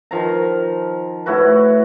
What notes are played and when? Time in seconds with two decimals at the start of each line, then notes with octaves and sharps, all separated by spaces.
0.11 D#3 F3 A#5
1.26 A2 E4 F#4 B4